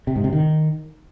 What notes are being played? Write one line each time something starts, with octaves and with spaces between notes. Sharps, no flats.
C3
G#2
C3
D#3